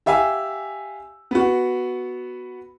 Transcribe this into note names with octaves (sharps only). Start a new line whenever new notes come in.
G4 E5 F5 G#5 E6
B3 F#4